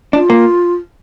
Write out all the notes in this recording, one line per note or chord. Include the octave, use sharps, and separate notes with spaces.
D4 F4
A#3